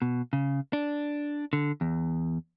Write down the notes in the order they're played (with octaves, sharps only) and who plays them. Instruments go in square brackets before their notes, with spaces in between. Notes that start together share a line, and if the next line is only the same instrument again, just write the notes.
[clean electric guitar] B2
C#3
D4
D3
E2